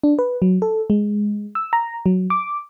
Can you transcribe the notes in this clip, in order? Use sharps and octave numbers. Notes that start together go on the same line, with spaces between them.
D4
B4
F#3
A4
G#3
E6
A#5
F#3
D6